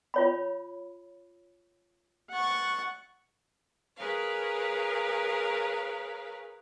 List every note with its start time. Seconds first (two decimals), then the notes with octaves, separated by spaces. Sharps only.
0.14 F4 C#5 B5
2.32 F#5 C#6 A6
3.97 G#4 A#4 B4 C#5 F5